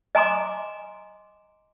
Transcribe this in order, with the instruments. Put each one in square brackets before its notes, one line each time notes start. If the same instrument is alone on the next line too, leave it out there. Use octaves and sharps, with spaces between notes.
[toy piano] D#5 G#5 A#5 C6 D6